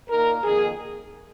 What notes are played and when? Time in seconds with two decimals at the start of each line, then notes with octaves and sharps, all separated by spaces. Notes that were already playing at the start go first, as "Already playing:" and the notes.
0.09 A#2 A#3 D#4 A#4
0.44 F2 D#3 A#3 G#4